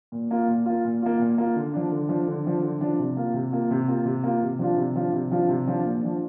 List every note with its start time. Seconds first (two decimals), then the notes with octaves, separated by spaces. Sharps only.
0.12 A#2
0.31 A#3 F4
0.48 A#2
0.66 A#3 F4
0.85 A#2
1.02 A#3 F4
1.19 A#2
1.38 A#3 F4
1.55 D3
1.73 F3 D4
1.91 D3
2.09 F3 D4
2.27 D3
2.45 F3 D4
2.62 D3
2.81 F3 D4
2.99 C3
3.17 A#3 F4
3.34 C3
3.52 A#3 F4
3.71 C3
3.88 A#3 F4
4.05 C3
4.23 A#3 F4
4.42 C3
4.59 F3 D4 F4
4.77 C3
4.95 F3 D4 F4
5.13 C3
5.31 F3 D4 F4
5.49 C3
5.67 F3 D4 F4
5.85 A#2
6.03 F3 D4